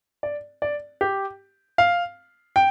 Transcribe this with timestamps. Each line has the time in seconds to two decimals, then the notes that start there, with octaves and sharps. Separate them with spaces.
0.23 D5
0.62 D5
1.01 G4
1.78 F5
2.56 G5